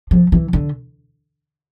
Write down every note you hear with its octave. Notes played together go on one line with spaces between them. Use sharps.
F3
E3
D3